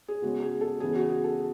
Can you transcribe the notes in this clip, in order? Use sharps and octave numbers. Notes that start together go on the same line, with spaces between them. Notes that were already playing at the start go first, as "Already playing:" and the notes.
G#4
C#3 G#3 B3 F#4
G#4
A4
C#3 E3 B3 G#4
F#4
G#4
A4